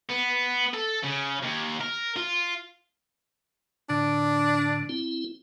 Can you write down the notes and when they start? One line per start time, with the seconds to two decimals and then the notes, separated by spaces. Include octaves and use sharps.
0.09 B3
0.73 A4
1.03 C#3
1.43 D#2
1.80 A#4
2.16 F4
3.90 A2 D3 D4
4.89 C4 E4